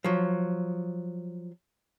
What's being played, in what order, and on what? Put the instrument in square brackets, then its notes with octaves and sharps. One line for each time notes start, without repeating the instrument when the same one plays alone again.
[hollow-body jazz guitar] F3 F#3